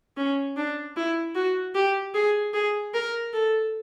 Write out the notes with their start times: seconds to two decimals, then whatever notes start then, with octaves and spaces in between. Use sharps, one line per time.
0.17 C#4
0.57 D4
0.97 E4
1.35 F#4
1.75 G4
2.14 G#4
2.54 G#4
2.94 A#4
3.33 A4